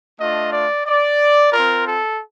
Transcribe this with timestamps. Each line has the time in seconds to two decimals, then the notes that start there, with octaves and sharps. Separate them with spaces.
0.19 A3 D4 F4 D#5
0.52 D5
0.86 D5
1.52 C4 F4 A#4
1.86 A4